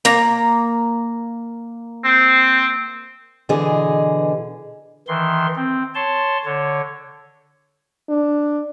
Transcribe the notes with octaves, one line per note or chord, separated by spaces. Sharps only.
A#3 A#5
C4
B2 D3 E3 G#4 D#5
D#3 E3 C6
C4
C#5 A5 C6
D3 C#5
D4